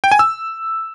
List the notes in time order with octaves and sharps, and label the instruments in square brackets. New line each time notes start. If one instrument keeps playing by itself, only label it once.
[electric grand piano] G5
G#5
E6